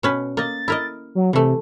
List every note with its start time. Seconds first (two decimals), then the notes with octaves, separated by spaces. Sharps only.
0.03 B2 C#4 B4
0.37 A#3 D#5 A6
0.68 E4 A#4 D#5
1.15 F#3
1.33 C3 E3 A3